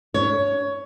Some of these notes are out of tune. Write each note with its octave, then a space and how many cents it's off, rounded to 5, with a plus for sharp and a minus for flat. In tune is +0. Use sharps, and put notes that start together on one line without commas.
D4 -35 C#5 +15